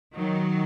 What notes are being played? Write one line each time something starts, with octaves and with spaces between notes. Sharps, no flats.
D#3 F#3